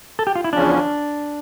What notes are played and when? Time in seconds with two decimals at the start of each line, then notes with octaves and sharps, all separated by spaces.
0.19 A4
0.27 G4
0.35 F4
0.44 E4
0.52 E2 C#3 F3 C#4 D4